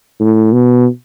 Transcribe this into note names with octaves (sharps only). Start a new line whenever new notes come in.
A2
B2